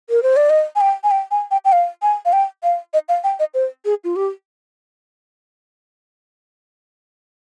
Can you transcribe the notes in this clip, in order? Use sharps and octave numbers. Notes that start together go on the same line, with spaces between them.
A#4
C5
D5
D#5
G#5
G5
G#5
G5
G#5
G5
G5
F5
G#5
F5
G5
F5
D#5
F5
G5
D#5
C5
G#4
F4
G4